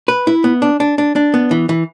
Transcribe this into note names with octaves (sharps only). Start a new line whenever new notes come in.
B4
E4
B3
D4
D4
D4
D4
B3
E3
E3